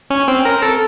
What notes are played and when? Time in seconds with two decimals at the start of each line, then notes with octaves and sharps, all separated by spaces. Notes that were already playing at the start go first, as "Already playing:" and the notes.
0.10 C#4
0.28 C4
0.45 A#4
0.62 A4